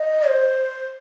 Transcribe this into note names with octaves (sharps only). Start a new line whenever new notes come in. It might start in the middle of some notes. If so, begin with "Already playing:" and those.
Already playing: D#5
C5